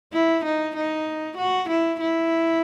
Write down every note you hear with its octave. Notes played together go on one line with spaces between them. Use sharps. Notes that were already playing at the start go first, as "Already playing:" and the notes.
E4
D#4
D#4
F#4
E4
E4